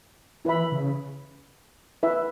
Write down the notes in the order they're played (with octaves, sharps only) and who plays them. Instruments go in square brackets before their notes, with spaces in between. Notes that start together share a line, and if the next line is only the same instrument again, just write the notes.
[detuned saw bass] E3 [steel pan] E4 B4 E5 B5
[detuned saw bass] C#3
[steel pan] E4 B4 E5